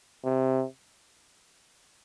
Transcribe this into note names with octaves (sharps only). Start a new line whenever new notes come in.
C3